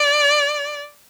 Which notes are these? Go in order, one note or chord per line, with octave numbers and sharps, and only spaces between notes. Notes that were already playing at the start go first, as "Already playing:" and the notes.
Already playing: D5